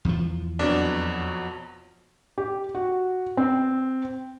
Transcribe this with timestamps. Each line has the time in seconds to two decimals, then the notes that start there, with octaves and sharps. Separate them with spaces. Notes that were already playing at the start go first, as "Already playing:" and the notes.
0.05 E2 F3
0.59 F2 B2 F#3 D4
2.38 G4
2.75 F#4
3.37 C4